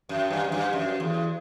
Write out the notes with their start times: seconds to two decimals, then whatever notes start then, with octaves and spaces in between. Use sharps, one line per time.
0.09 F#2
0.30 G2
0.44 F#2
0.52 G2
0.73 F#2
1.00 E2